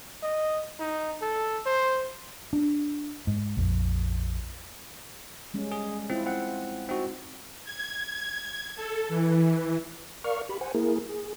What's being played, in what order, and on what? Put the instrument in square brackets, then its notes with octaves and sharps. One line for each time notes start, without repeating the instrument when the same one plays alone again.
[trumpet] D#5
D#4
A4
C5
[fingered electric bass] D4
G#2
A#1 F2
[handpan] G3 G#3 C#4
[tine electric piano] G#4
[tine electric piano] C4 [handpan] E4 F4
[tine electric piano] C4 F#5
C4 D#4 F#4
[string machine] G#6
A4
E3
[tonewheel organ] A#4 D5 F5 C#6 F6
G4 B5
C5 F#5 G#5
A#3 E4 G#4 A#4
G#4